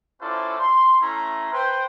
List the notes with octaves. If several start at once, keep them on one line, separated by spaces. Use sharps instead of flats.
C#4 E4 F4 A4 C5 D5
C6
A3 C#4 E4 A#5 C6
B4 C5 G5